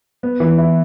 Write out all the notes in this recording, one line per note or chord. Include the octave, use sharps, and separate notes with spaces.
B3
E3
E4